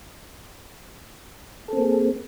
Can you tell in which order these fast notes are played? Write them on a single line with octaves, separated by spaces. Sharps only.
A4 C4 A#3 G#4